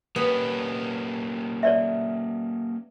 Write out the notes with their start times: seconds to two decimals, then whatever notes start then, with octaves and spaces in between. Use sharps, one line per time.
0.16 A#3 B3 C#4 G4
1.63 C#5 D5 E5